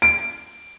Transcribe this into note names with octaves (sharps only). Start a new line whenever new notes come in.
D7